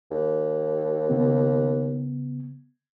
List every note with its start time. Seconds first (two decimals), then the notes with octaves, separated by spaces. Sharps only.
0.11 D#2
1.10 C#3 B3